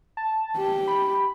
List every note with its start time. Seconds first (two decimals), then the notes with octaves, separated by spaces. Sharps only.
0.17 A5
0.57 G4
0.87 B5